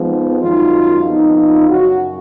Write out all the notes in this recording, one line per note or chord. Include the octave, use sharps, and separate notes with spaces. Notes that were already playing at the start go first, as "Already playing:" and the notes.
Already playing: F2 F3 G#3 B3 D#4
F#2 D#3 G#3 D#4 F4
F2 F3 B3 D#4
F4
F#2 C#3 F#3 F#4